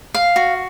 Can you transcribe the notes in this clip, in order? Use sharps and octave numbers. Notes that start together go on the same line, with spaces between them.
F5
F#4